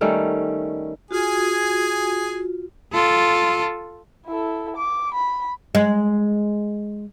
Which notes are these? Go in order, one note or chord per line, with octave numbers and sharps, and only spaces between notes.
D#3 G3 A3 C#4
F4 F#4 G#4 G#5
F4 A4
E4 A4
D6
B5
G#3